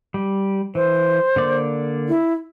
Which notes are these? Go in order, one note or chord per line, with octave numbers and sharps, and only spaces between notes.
G3
E3 C5
D3 A#3 D5
E4